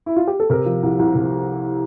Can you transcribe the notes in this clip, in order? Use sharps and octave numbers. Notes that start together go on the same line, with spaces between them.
E4
F4
G4
A4
C3 A#4
F3
C2
C2
C3